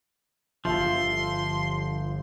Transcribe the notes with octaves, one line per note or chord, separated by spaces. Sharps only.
G1 F3 F4 E5 C6